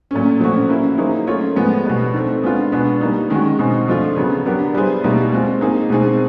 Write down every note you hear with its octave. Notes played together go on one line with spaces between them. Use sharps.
A#2 F#3 A3 C#4
A2 F3 A3 C#4 F#4
A#3 C#4 E4
F#3 A#3 D#4 G#4 C5
A3 C#4 F4 A#4 C#5
A2 F3 G#3 B3
B2 G3 B3
A3 C4 D#4
G#3 B3 D4 F4
B2 G#3 B3 D4
G3 A#3 D#4
D#3 G#3 C#4 F#4
B2 G#3 C4 D#4
F3 A3 D4 F4
C#3 F#3 B3
F#3 B3 D4 G4 A#4
G3 B3 E4 G#4 C5
B2 G3 A#3 D#4
G#3 C4 F4
A#3 D#4 G#4
B2 G#3 C4 D#4 G#4